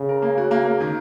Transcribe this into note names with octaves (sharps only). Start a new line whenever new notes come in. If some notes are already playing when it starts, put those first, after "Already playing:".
Already playing: C#3
A#4
A#3
F#4
A#3
A#3
D#3